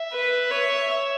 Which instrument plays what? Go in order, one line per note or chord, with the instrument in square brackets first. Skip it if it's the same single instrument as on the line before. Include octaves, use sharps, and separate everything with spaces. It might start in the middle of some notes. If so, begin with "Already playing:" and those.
Already playing: [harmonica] E5
[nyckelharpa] B4
C#5
[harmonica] E5